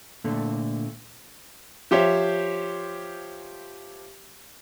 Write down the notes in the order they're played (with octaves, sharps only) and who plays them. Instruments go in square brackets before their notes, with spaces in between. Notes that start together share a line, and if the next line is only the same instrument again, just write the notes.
[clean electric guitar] A#2 D3 A3
[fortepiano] F3 G4 C5 C#5 E5